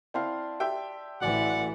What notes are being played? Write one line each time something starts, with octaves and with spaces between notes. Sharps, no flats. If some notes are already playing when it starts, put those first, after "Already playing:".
C4 E4 D5 F5 A5 C6
G4 E5 G5
A1 E3 F#4 D5 F#5 G#5